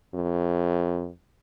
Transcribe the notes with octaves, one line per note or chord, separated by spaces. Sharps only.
F2